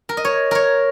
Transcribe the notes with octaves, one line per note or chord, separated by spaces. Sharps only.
A#4
D#5
C#5
A#4 C#5